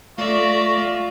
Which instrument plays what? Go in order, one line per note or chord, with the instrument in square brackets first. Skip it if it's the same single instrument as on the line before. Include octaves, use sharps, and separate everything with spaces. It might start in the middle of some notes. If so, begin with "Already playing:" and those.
[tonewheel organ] A3 A#6 [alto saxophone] F4 [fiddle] D5 E5 [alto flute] C#6